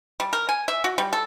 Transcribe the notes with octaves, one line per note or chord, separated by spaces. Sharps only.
G3
A#4
G#5
E5
F#4
G3
A4